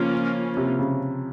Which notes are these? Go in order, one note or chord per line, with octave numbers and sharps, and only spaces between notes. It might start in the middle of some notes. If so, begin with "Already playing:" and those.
Already playing: C#3 F3 A#3 C#4 F4
C3
C#3